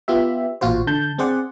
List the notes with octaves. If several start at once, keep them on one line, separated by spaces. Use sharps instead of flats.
B3 F4 G4 E5
A1 A#2 F4 F#4 C5
D3 A5 G6
C4 G#4 C5 D5 F#5